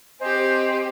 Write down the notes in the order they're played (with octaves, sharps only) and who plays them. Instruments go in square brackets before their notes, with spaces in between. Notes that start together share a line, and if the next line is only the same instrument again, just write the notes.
[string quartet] C4 G4 [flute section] C5 D#5 G#5